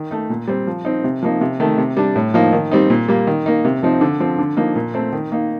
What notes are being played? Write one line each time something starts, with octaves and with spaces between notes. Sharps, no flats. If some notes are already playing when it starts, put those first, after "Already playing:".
Already playing: D#3
A3 D#4
A#2
G3 C4
F3
C4 D#4
C3
F3 A#3 D#4
C3
D#3 A3
C3
G3 D4
A2
F3 A#3 D#4
D#3
G3 C4 D#4
A#2
G3 A#3
D#3
A#3 D#4
C3
F3 C4 D#4
D3
F3 C4
D3
F3 A#3 D#4
A#2
A3 C4
D#3
A#3 D#4